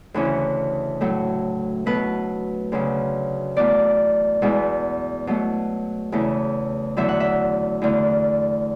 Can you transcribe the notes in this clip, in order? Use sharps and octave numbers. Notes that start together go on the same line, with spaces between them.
D2 C#3 E3 C#4
A2 F#3 A3
B2 F#3 A3 B4
D2 C#3 F#3
E2 B2 A3 D5
E2 B2 G#3
B2 F#3 A3
E2 C#3 E3 A3
E2 D3 F#3 A3 E5
F#5
E5
E2 D3 A3